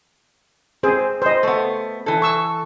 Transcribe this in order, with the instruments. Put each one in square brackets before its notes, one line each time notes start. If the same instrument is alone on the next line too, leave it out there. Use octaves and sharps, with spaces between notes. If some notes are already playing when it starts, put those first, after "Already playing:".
[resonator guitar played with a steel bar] C4 [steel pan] G#4 C5
[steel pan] C5 D#5
[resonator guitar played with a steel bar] A3 B3
E3 A4
[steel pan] C#6 E6